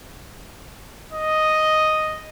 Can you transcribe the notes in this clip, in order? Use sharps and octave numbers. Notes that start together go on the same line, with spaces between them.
D#5